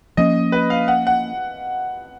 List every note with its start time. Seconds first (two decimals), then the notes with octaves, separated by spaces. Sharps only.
0.17 F3 A#3 C#4 D#5
0.52 B4
0.70 F5
0.88 F#5
1.07 F#5